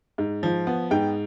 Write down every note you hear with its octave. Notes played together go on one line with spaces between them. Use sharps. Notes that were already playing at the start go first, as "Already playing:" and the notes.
G#2
F3
B3
G#2 G5